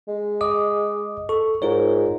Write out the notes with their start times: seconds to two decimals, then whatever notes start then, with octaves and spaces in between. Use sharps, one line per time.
0.08 G#3
0.41 D#5 D6 D#6
1.29 A4 C#6
1.62 G#2 F4 A#4 C#5